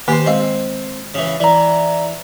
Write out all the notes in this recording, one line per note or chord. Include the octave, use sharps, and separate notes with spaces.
D#3 A#3 G4 C5 G#5
G#3 C4 D#5
C#3 E3
E3 D5 A#5